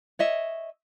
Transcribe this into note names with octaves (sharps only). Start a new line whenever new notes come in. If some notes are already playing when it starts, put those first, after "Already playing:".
C#5 D#5 E5